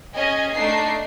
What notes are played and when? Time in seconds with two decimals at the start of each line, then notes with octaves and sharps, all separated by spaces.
0.15 C#4 G#4 D#5 G#5
0.54 A3 D4 D#4 C7